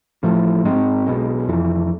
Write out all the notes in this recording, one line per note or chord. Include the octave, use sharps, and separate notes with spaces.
A1 A2 F3 A3
G#2 G#3 C4
B1 B2 G#3
F1 F2 E3